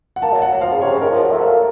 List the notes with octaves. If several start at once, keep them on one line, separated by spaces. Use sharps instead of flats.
F#5
A#3 A5
F#3
F#5
F#3
F3 F5
C#3
C3 C#5
C#3
D#3 A#4
F3
F#3
A3
A#3 A4